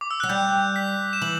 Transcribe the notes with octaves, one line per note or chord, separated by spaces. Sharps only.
D6
E6
F#3 F#6
G3 G6
B6
E7
E3 F#7